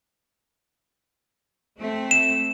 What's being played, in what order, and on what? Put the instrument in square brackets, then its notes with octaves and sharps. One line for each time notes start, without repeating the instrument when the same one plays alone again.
[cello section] A3 C4
[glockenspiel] E7